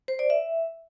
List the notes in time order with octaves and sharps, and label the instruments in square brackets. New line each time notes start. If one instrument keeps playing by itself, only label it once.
[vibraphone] C5
D5
E5